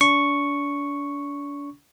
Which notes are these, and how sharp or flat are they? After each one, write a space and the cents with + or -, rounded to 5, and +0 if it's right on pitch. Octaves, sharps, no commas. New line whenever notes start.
D4 -40 C#6 +0